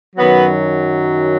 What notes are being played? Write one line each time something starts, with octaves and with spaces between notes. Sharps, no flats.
F#2 D#3 F#3 B3